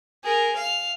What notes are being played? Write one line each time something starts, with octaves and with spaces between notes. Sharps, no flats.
G#4 A#4
F5